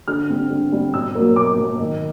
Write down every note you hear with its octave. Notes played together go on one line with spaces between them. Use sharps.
D3 F6
G3 C4
D3
G3 C4
B2 E6
F#3 A#3
B2 D6
F#3 A#3
D#3